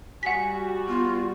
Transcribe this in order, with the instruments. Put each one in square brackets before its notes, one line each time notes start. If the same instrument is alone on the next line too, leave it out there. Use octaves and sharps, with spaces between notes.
[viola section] G3 F#4 [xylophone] F#5 B6 [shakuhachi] G#5
[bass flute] B3 [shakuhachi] F4